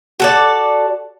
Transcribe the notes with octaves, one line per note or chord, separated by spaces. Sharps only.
F#4 A4 D5